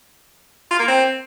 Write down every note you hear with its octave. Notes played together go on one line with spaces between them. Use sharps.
F4
A#3
C4